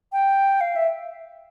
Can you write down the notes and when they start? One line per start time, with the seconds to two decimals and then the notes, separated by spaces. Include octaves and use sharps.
0.12 G5
0.61 F5
0.76 E5